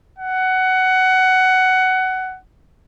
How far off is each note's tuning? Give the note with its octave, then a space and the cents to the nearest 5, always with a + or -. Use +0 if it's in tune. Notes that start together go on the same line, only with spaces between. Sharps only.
F#5 +15